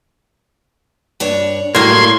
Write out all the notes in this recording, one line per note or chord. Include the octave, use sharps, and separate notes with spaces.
G2 D4 C#5
A2 F#3 G3 A#3 C6 G#6